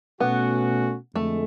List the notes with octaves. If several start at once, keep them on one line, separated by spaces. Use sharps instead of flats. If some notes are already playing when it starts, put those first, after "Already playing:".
B2 A3 B3 C#4 F#4
F2 D3 G#3 A3